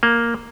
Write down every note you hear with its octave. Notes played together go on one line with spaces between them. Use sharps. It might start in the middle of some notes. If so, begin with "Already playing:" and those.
A#3